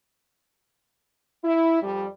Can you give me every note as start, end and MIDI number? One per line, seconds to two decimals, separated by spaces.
1.44 1.78 64
1.81 2.06 41
1.81 2.06 55